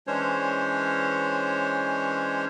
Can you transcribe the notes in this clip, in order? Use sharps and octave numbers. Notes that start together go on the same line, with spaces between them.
E3 G#3 C#4 D4 C5 C#5